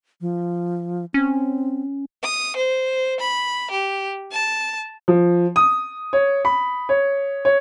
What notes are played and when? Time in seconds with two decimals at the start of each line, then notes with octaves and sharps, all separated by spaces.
0.21 F3
1.14 C4 C#4
2.23 D#6
2.56 C5
3.20 B5
3.71 G4
4.32 A5
5.08 F3
5.56 D#6
6.13 C#5
6.45 B5
6.89 C#5
7.45 C#5